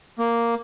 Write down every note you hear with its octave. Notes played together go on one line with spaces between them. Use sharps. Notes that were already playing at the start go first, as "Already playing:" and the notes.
A#3